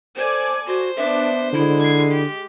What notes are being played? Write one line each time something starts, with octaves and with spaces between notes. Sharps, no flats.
A4 C5 D5 G#5
F#4 C5
B3 D4 E5
D3 G#3 E4
G#6 C7
G4